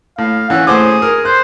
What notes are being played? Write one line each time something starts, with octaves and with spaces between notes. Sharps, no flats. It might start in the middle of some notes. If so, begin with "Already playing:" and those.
A2 F5
E3 C#4 F#5 E6
A2 G#4 C5 D6
A#4
C5 F#6